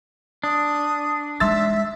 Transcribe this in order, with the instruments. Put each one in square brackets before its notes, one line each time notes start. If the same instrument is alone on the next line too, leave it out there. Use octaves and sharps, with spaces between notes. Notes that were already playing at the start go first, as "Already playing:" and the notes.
[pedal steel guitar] D4 [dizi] D#6
[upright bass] G#3 D#4 [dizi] E5 [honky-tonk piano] C6 E6 A6